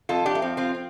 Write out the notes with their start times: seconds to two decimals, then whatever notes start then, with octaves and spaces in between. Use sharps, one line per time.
0.09 F2 F4 A4
0.26 D4 G4
0.35 A3
0.42 F3 C4
0.57 C4 F4
0.75 C4